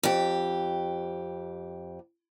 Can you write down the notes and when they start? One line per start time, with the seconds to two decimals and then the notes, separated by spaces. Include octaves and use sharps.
0.03 F2 G4